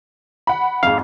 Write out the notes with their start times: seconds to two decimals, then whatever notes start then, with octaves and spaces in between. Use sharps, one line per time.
0.47 F#5 B5
0.83 F2 G#2 F5